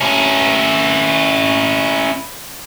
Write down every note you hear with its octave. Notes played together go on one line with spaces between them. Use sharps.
C#4 E4